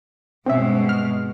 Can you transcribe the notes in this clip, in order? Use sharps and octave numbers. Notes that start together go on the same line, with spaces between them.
G2 B2 G#3 C4 C#4 E5
F6